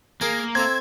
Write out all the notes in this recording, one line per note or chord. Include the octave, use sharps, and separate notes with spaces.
A#3 G#4 A#4 G#5
C4 A4 E5 G#6